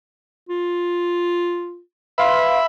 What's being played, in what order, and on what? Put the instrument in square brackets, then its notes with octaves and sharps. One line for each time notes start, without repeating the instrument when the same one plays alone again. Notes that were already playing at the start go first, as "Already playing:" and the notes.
[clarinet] F4
[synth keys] B4 F5 C6 [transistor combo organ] E5 B5